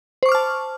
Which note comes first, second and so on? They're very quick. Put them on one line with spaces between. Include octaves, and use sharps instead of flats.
C5 C#6 D6 F6 A5